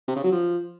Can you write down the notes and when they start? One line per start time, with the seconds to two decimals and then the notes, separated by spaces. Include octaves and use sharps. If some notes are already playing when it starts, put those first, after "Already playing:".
0.08 C3
0.16 C#3
0.24 F#3
0.32 F3